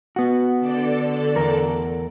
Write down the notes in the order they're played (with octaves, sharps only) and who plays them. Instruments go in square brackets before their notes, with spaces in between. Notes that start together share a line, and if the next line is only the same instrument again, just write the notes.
[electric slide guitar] B3 F#4
[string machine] D3 A4 D5
[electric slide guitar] E2 A#4